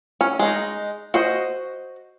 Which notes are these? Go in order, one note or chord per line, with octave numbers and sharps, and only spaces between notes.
C#4
G#3 D#4
F#4 C5 D#5